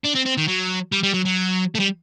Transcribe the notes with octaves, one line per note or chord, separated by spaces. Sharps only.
D4
C4
C4
D#3
F#3
G3
G3
F#3
F#3
A3
G3